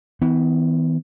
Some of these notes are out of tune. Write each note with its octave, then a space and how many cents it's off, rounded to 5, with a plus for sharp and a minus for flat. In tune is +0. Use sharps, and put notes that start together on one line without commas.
E3 -40 B3 +25